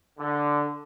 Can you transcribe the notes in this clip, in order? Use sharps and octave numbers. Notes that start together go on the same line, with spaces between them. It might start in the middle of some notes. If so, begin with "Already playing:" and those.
D3